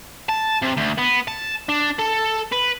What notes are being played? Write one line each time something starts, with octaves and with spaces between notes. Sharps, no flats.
A5
C3
D2
B3
A5
D4
A4
B4